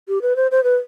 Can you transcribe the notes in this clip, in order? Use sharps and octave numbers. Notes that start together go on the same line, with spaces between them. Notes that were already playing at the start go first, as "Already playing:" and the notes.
G4
B4
C5
C5
B4